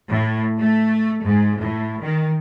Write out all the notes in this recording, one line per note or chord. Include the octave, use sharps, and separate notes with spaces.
A2
A3
G#2
A2
D#3